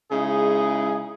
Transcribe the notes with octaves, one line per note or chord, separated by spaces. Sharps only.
C#3 G#3 D#4 E4 G#4